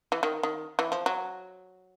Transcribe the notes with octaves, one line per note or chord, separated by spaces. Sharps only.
E3
D#3
D#3
E3
F3
F#3